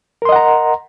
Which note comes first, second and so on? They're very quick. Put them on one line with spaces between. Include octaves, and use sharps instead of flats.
A#4 C6 D#5 F#5 A#5